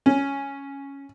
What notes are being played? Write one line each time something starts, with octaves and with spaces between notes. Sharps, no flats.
C#4